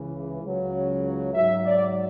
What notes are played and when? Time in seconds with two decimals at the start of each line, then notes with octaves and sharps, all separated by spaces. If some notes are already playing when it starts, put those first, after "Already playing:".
Already playing: C#2 C#3 E3
0.41 C#2 C#3 F#3
1.33 G#2 F#3 E5
1.65 D5